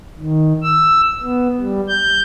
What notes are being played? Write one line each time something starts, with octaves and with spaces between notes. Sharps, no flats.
D#3
E6
B3
G3
G6